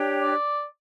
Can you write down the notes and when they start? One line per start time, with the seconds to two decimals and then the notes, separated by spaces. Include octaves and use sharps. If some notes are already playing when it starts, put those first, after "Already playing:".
Already playing: D4 G4 C#5 G5
0.21 D5